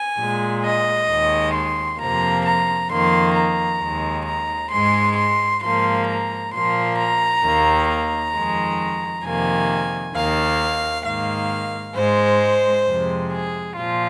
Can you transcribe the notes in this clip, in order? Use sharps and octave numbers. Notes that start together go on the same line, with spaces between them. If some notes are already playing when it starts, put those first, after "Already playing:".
Already playing: G#5
A#2 G#3
D#5
D#2 D#3 G#3
C6
F2 C3 F3 A#3 A#5
A#5
F2 D#3 A#3 C6
A#5
D#2 D#3 G#3
A#5
G#2 G#3 C6
C6
G#2 F3 A#3 C6
A#5
A#2 F3 A#3 C6
A#5
D#2 D#3 A#3
A#5
F2 D#3 G#3
F2 C3 D#3 A#3 G#5
D#2 D#3 A#3 F5
G#2 D#3 A#3 F5
G#2 G#3 C5
F2 C3 G#3
G#4
A#2 F3 F4